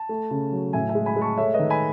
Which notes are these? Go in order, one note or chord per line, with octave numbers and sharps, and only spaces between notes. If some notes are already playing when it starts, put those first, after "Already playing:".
Already playing: A5
A3
C#3
F#3
A2 E5 G#5
E5 G#5
G#3
G#5 B5
G#3 A5 C#6
A3 C#5 E5
B4 D#5
D#3
G#5 B5